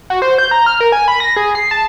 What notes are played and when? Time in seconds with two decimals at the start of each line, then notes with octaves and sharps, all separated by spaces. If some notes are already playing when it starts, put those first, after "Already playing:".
0.10 F#4
0.22 C5
0.38 G6
0.51 A#5
0.66 F6
0.81 A#4
0.92 G#5
1.08 B5
1.20 A#6
1.36 G#4
1.55 C7
1.71 A5